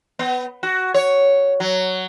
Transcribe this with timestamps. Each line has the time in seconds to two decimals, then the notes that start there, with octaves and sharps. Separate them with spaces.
0.19 B3
0.63 F#4
0.94 C#5
1.60 F#3